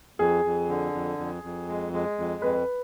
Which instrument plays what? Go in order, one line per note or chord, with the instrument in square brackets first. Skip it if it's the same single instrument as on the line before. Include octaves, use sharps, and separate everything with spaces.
[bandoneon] F2 [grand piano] G#4
[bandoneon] F2
D3
F2
F2
F2
G#3
G#3
F2
[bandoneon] F2 [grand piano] B4